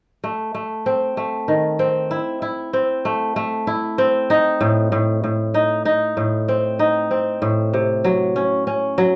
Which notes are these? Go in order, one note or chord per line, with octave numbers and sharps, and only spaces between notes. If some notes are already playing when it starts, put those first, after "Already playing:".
A3
A3
C4
A3
D#3
C4
E4
E4
C4
A3
A3
E4
C4
D#4
A2
A2
A2
D#4
D#4
A2
C4
D#4
C4
A2
C3
F#3
C#4
C#4
F#3